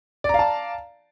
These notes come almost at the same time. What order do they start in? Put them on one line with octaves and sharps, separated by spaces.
D5 A#5 F5 A5